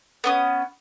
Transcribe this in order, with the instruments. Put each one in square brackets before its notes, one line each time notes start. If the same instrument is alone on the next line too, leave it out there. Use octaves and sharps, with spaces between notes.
[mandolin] B3 C#4 D#6